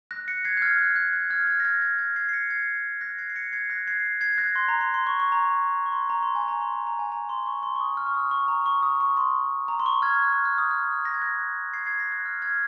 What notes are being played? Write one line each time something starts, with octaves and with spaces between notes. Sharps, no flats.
F#6 A#6
A#6 C#7
G#6 C7
F#6
F6 G#6
F#6
F#6
F#6
F6 G#6
F6 G#6
A#6
F6 G#6
F6 G#6
F6 G#6
G#6 C7
C7
A#6 C#7
G#6 C7
F#6 A#6
G#6 C7
C7
A#6 C#7
G#6 C7
F#6 A#6
G#6 C7
G#6 C7
F#6 A#6
C6
A#5
C6
C6
C#6
C#6
A#5
C#6
C6
A#5
C6
G#5
A#5
C6
A#5
A#5
G#5
A#5
C6
C#6
C6
C#6
D#6
F6
C#6
D#6
C#6
A#5
C#6
D#6
C#6
C6
A#5
C6
C#6
F6 G#6
F#6
F6
F6
D#6
F6
A#6
G#6
F#6 A#6
G#6 C7
G#6 C7
F#6 A#6
F#6
F6
F6 G#6